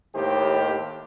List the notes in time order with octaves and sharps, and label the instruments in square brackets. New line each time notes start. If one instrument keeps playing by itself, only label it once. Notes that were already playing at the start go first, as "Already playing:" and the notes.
[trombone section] D#2 A2 D#3 G4 C5